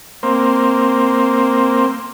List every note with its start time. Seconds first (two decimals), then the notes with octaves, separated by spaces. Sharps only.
0.23 A#3 C4